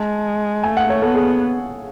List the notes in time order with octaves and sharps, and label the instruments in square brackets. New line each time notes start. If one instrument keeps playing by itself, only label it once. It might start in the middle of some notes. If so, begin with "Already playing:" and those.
Already playing: [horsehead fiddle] G#3 [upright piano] A5
[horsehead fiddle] A3 [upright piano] G#5
[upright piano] F#5
C#5
[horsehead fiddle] B3 [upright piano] A4
[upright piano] G#4